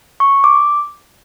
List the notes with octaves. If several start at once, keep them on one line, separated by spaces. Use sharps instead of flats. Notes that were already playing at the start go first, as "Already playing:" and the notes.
C#6
D6